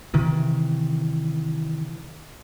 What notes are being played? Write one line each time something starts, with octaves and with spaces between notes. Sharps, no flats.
C3 D#3 E3